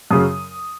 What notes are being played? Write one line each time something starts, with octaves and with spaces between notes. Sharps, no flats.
F#2 C#3 F#3 D#6